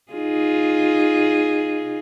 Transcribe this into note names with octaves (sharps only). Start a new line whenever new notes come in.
D#4 F4 G#4